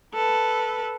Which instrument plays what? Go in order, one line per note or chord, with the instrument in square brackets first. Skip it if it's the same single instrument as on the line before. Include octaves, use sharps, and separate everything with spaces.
[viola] A4 B4